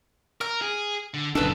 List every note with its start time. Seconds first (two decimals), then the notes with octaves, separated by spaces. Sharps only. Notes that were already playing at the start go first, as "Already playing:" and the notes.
0.41 A#4 F6
0.62 G#4
1.14 D3
1.35 F#1 A#2 C#3 D4 A4 B4